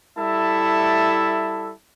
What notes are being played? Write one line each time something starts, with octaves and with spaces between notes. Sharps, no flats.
G3 E4 A4 E5 A5